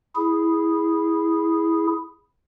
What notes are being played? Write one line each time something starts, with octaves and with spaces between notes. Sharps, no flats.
E4 G#4